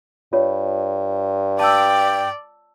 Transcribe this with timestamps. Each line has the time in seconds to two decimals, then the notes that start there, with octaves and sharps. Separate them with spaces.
0.33 G2 F4 C#5
1.59 D5 G5 A5 E6